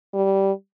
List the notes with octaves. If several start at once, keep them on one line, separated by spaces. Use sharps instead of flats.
G3